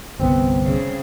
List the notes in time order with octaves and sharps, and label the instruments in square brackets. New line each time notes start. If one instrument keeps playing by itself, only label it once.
[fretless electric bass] G1 C2 B3 [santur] C4
[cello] C#3